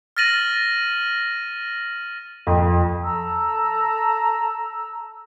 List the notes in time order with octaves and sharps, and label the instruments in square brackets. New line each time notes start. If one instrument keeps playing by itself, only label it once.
[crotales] F6 A6 A#6 D#7 F#7
[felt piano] F2
[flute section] A4 A5 A#5 E6